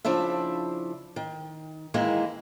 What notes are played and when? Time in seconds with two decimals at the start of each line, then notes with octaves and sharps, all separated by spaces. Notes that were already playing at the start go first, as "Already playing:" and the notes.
0.05 C#3 F3 D4 E4 E5
1.16 D#3
1.94 D#3 E3 G#3 A#3 E4